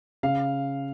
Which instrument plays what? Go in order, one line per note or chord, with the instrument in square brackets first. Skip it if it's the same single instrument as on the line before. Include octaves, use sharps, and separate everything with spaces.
[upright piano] C#3 F5